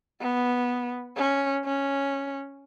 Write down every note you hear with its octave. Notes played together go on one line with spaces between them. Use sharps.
B3
C#4
C#4